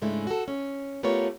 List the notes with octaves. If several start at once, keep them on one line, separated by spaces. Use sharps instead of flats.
G#2 C#3 G#3 A3 D4 E4
F#4 A4
C#4
A3 B3 F4 G4 A#4 C#5